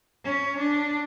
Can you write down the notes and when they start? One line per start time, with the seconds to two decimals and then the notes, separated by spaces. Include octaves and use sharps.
0.24 C#4
0.58 D4